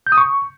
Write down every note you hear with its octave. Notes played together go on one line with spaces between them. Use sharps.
G6
D#6
C#6